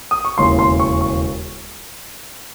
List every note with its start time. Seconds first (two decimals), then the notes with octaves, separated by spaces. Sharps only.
0.11 D#6
0.25 C#6
0.38 E1 D#2 C#3 E3 C6
0.59 C6
0.80 C#6
1.01 C#6